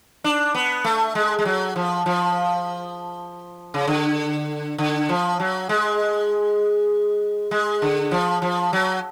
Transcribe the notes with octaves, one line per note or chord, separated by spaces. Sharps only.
D4
B3
A3
G#3
G#3
F#3
F3
F3
C#3
D3
D3
F3
F#3
G#3
G#3
D3
F3
F3
F#3